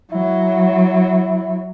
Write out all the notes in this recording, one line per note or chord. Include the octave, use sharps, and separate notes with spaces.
F#3 E4